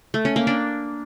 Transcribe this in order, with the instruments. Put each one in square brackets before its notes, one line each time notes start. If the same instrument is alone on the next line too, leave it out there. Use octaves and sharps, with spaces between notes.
[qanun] A3
C#4
A#3
D4